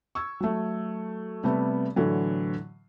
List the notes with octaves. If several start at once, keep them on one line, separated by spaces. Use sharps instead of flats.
C#6 E6 G#6
F#3 A3
C3 G3 A3 B3
A2 D3 E3 F#3